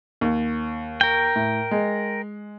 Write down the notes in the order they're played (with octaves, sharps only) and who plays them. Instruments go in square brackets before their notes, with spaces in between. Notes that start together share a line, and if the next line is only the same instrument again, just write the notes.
[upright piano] D#2
[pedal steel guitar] A#4 G5
[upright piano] A2
G#3